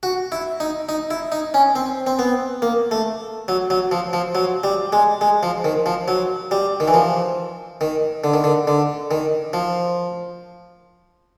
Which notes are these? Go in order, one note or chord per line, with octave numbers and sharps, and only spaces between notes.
F#4
E4
D#4
D#4
E4
D#4
C#4
C4
C4
B3
A#3
A3
F#3
F#3
F3
F3
F#3
G3
G#3
G#3
F3
D#3
F3
F#3
G3
D#3
E3
F3
D#3
D3
D#3
D3
D3
D#3
F3